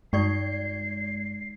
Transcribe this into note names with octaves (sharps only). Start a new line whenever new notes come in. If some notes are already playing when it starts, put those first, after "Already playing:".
G2 G#3 D#4 D5 A5 C#6 G#6 C7